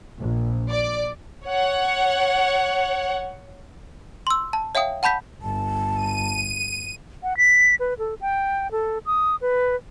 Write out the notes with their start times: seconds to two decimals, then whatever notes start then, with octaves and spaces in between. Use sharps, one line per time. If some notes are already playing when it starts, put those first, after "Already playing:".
0.20 A#1
0.71 D5
1.45 C#5 F#5
4.27 C6 E6
4.53 A5
4.75 C#5 E5 F5 G5 D#6
5.03 F#5 A5 B5 G6 B6
5.42 G1 A5
5.96 D#7
7.23 F#5
7.37 B6
7.80 B4
7.99 A4
8.21 G5
8.71 A4
9.06 D#6
9.41 B4